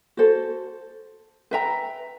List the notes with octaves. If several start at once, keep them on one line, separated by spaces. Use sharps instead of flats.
F#4 A4 C5
B4 E5 G5 A#5